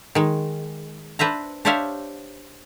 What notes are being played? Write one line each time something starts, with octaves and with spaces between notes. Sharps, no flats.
D#3 G#3
D4 B4 C5 E5 A#5
D4 G4 C5 C#5 E5 F5